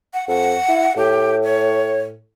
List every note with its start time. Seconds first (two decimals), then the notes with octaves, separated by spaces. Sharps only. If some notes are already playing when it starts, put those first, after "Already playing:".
0.14 F#5
0.28 F2 F#5
0.69 E4
0.97 A2 G4
1.44 C#5